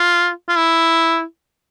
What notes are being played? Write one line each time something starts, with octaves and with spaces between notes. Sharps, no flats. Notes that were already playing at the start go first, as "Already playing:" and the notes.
Already playing: F4
F4
E4